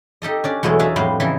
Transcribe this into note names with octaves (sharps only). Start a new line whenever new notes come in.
D#4 G4 A4 D#5
C#4 D4 D5
E2 B2 F#3 G#3 A3 G#4
D4 F#4 G#4 A#4 E5 A5
F2 A2 G3 B3 C5 F5
C#3 E3 D#4 E4 E5 C6